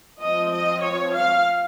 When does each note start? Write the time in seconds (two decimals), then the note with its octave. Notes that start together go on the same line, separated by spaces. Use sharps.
0.22 F3 C4 D#5
0.53 D#5
0.83 C#5
1.14 F5